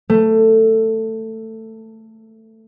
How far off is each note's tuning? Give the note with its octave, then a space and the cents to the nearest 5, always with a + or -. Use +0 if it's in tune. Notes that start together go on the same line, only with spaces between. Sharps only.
A3 +15